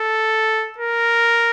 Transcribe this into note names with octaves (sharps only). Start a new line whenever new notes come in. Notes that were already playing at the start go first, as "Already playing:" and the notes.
Already playing: A4
A#4